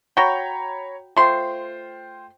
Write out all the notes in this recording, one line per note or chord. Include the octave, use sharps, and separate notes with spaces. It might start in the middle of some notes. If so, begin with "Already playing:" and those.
F#4 C#5 G5 A#5 B5
A3 F4 C5 G5 C6